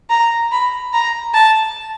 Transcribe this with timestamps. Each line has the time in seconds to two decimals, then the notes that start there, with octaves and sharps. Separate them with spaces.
0.10 A#5
0.52 B5
0.93 A#5
1.34 A5